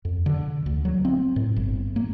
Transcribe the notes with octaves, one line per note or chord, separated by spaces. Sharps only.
F2
D3
D2
F#3
C4
A2
G1
A#3